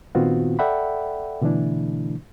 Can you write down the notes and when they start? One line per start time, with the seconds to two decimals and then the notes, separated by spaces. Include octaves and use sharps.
0.15 A#2 D#3 B3 C4 F4 F#4
0.59 A4 D5 E5 F#5 G5 B5
1.42 B2 D3 E3 A3 D4 E4